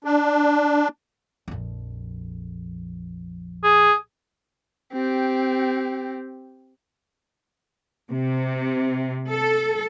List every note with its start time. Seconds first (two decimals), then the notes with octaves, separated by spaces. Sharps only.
0.04 D4
1.48 A#1 F2
3.64 G#4
4.93 C4 G4
8.11 C3
9.29 A4